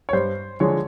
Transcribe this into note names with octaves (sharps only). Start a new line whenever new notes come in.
C#5
G2 C5
D3 F3 G#3 C#5